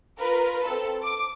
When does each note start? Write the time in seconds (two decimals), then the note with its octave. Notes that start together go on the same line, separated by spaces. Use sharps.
0.19 F4 A#4 B4
0.64 C4 A4
1.02 D6